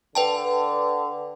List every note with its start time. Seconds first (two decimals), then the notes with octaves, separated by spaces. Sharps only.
0.15 D3 B4 G5 A5